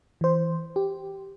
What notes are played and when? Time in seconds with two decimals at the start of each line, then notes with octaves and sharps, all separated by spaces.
0.21 E3 C5
0.76 G4